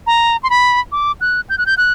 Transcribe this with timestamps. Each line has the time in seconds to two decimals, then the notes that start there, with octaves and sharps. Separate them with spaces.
0.07 A#5
0.43 C6
0.50 B5
0.92 D6
1.21 F#6
1.50 G6
1.58 F#6
1.66 G6
1.78 F#6